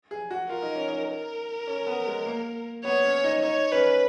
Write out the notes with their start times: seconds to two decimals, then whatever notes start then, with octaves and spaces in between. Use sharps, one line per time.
0.11 G#4
0.31 F#4
0.50 F4 A#4
0.63 D#4
0.76 C#4
0.88 D#4
1.09 A#4
1.67 C#4
1.87 B3
2.07 G#3
2.26 A#3
2.85 B3 C#5
3.04 C#4
3.24 D#4
3.43 D#4 C#5
3.72 C#4 B4